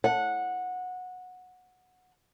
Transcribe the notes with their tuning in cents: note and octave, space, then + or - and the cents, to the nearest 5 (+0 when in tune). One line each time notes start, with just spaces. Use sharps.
F#5 -15